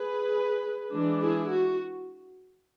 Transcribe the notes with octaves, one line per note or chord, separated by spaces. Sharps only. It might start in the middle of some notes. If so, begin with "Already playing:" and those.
Already playing: G#4 B4
E3 G#3 D4
E4 G#4
F#4